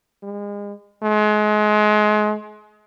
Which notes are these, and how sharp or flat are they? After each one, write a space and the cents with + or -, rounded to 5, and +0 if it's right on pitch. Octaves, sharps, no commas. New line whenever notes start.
G#3 -35
G#3 +30